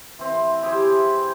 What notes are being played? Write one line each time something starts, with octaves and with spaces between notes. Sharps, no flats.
E3 C4
E4 G4 G#4 C5